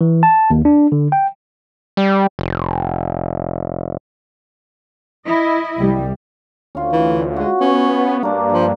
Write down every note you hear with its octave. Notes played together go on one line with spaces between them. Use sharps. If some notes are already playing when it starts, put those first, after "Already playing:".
E3
A5
D#2
D4
D3
G5
G3
F1
E4 D#5
C2 G3
D2 C#4 F4
E3
G#3 F#4
B3 C#4
G2 A#3 D4
F3